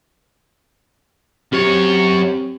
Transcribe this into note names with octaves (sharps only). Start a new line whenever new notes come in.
F#2 C4 G4 C#5